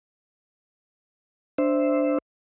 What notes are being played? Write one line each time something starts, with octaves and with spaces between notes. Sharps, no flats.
D4 C5 E5